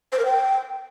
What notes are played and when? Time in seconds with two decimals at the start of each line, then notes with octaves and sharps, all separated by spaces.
0.12 C5
0.19 A#4
0.25 G5